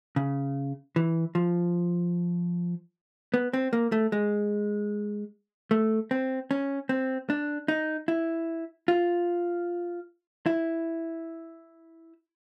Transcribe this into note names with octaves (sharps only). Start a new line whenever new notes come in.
C#3
E3
F3
B3
C4
A#3
A3
G#3
A3
C4
C#4
C4
D4
D#4
E4
F4
E4